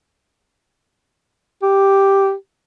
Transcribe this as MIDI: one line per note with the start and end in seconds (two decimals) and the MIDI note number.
1.63 2.33 67